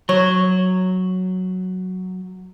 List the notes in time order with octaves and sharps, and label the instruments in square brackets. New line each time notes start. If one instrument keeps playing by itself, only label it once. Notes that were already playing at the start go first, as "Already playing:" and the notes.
[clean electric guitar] F#3 [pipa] C#5